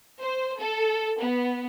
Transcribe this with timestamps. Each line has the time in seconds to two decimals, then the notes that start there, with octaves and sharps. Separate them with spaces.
0.21 C5
0.59 A4
1.19 B3